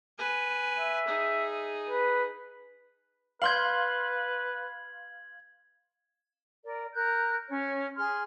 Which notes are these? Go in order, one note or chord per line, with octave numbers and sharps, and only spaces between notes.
B4 G#5
E5
D#4 G#4
B4
B4 F5 C6 G6 G#6 F#7
A#4 D5
A#4 F#6 G6
C#4 C#5
G#4 C6 F6